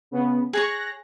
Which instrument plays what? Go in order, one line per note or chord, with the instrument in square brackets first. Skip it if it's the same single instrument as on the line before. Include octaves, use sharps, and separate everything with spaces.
[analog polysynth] C#3 B3
[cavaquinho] G#4 C#5 C#6 [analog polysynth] F#6 A#6